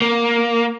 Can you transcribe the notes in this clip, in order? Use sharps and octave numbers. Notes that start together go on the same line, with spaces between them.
A#3